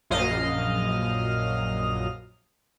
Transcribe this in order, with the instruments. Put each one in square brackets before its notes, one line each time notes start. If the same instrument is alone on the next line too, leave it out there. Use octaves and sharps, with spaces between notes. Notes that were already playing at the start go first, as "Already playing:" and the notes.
[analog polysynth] A#1 F#2 D#5 F5 F6